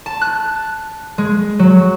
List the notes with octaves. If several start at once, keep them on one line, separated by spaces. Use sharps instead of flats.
A5
F#6
G#3
F#3